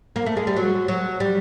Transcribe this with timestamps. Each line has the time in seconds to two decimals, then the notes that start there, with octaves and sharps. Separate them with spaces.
0.16 A#3
0.26 A3
0.37 G#3
0.47 G3
0.57 F#3
0.88 F#3
1.20 G3